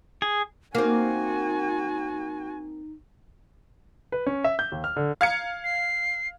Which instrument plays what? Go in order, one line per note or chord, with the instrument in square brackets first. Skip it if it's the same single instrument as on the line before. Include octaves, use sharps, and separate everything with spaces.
[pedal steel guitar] G#4
[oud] A#3 C4 [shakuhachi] D#4 [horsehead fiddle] F#4 G#5
[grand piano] B4
C#4
E5
G6
D#2
F6
D3
[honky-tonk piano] F5 G#6 C#7
[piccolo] C7